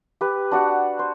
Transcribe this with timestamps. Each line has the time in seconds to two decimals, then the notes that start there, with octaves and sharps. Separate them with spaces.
0.21 G4 B4
0.51 D4 F#4 D5 F#5
0.99 C5